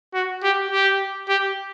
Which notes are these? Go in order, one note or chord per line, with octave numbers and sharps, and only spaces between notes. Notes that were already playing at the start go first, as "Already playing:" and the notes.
F#4
G4
G4
G4